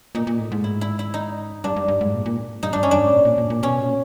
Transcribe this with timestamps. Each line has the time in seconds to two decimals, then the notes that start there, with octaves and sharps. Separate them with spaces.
0.15 A#2 D#4
0.27 A#2
0.39 A2
0.52 G#2
0.64 E4
0.81 E4
0.99 E4
1.14 D#4
1.64 G2 D4
1.76 G2
1.88 G2
2.01 G#2
2.14 A#2
2.26 A#2
2.63 G2 D#4
2.73 G2 D4
2.83 C#4
2.89 F#2 D4
3.00 G#2
3.13 A#2
3.25 A#2
3.38 A#2
3.50 A#2
3.63 B2 C#4
3.80 A#2